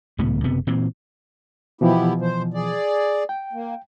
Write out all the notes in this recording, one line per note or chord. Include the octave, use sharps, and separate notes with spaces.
D#1 C#2 A2 B3
F#1 C3 B3
A#2 E3 C4
B2 E3 F3 B3 E4 G4
C5
G#4 D5
G5
A#3